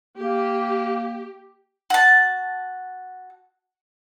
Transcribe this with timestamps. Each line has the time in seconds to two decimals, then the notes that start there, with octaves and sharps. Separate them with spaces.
0.18 A#3 G4
1.90 F#4 A5